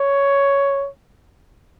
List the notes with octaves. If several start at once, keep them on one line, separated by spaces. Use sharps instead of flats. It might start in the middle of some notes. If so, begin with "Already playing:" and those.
Already playing: C#5